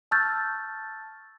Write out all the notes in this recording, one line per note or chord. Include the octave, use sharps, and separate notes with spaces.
A5 C#6 E6 F6 G6 A6